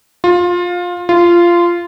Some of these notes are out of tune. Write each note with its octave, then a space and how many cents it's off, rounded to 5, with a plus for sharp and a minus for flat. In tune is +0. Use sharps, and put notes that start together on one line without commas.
F4 +20
F4 -15